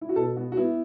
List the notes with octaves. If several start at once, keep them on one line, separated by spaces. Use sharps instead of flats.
E4
F#4
B2 A4
B3 F#4
F#4
B3 E4